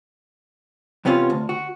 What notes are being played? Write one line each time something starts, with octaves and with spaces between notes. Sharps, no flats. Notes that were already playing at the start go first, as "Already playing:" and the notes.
E2 C3 B3 C#4 F4
D2
F#4